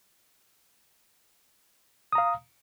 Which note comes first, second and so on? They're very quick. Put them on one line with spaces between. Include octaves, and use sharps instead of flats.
D#6 A#5 F5